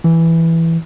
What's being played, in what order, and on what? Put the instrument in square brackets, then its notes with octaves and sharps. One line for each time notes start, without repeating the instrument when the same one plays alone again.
[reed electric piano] E3